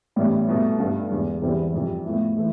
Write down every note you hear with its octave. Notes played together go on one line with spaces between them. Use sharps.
A1 A2 G3 B3
C2 B2 A3
G1 G2 D3 A3
E1 E2 D3
E2 C3 G3 C4 E4
F1 F2 C3 G3
A2 F3 B3 E4
E3 A3